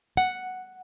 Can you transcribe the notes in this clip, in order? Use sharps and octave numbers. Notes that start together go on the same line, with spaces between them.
F#5